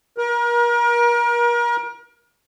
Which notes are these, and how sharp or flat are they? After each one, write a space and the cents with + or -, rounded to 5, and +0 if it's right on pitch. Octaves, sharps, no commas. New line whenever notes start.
A#4 +35